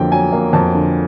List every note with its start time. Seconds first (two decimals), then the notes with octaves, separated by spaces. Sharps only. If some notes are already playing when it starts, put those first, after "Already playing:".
Already playing: F2 D3 F#3 A#3 G5
0.12 F#3 G#5
0.32 A#3
0.53 F2 A5
0.74 D3